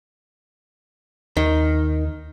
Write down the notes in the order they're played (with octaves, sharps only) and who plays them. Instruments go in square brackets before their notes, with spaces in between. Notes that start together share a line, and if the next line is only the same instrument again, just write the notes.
[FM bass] D#2 [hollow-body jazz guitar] D#3